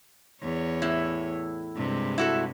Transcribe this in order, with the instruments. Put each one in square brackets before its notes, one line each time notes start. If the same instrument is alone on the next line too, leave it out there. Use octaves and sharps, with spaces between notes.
[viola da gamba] E2 C#5
[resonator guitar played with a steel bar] A2 E4
[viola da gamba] G2 C3 G#3
[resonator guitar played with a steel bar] E4 F#4 A4